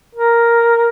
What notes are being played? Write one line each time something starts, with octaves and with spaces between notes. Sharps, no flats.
A#4